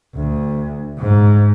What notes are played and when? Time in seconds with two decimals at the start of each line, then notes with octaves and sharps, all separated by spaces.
0.15 D2
0.99 G#2